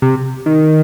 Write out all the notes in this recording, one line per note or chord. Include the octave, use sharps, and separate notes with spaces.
C3
D#3